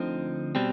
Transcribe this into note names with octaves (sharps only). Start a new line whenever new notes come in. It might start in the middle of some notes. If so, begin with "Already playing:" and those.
Already playing: D2 D3 F3 C4 D#4
B2 G3 C4